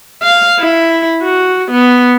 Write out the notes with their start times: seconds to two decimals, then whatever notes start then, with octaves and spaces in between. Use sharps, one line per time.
0.23 F5
0.60 E4
1.23 F#4
1.71 B3